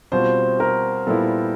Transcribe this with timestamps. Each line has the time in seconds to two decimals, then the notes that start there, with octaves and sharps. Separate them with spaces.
0.12 B2 G3 C4 F4 C5
0.60 A#4
1.07 A#2 G3 B3 E4 A4